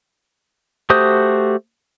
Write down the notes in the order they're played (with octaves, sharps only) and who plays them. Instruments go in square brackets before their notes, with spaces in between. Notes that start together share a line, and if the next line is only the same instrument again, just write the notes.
[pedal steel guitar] A3 F#4 G4 C5 D#6